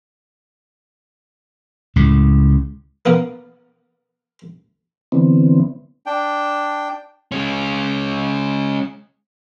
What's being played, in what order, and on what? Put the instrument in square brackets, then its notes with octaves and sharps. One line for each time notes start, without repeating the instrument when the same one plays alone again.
[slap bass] C#2 A2 C#3
[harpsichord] A#3 B3 A#4
[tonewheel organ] D3 E3 B3 C4
[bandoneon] D4 G5
[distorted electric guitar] G#3 C#4